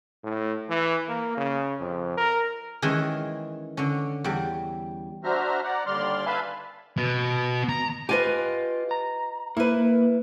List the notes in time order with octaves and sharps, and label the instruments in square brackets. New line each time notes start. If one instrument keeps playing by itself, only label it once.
[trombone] A2
E3
A#3
C#3
F2
A#4
[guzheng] D#3 E3 G#3 C#4
D3 C#4
E2 G3
[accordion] D4 F#4 C5 E5 A#5 F6
D5 F#5 A#5
D#2 D3 G3 D5 C6 F6
B4 E5 F5 G#5 A5 B5
[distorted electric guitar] B2
A#5
[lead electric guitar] F4 G4 [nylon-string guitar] B4 D#5 G#5
[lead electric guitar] A#5
[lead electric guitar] A#3 [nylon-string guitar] E4 B4